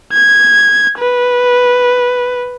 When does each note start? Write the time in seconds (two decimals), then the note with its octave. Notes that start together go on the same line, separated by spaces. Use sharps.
0.13 G#6
0.99 B4